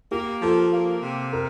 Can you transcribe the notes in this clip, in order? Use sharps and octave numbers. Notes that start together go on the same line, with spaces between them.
A#3 G4
F3 A4
A#3
C3
A#4